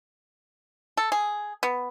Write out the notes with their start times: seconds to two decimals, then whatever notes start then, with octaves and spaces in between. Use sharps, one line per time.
0.97 A4
1.12 G#4
1.63 B3